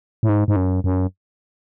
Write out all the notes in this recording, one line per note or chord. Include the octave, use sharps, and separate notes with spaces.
A2
G#2
G#2
F#2
F#2